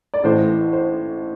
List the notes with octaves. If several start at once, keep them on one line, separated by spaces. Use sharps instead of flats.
D5
A1 A2 E3 A3 C5
C5